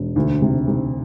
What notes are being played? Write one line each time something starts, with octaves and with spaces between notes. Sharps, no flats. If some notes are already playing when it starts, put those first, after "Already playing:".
Already playing: E1
D2
C3
C3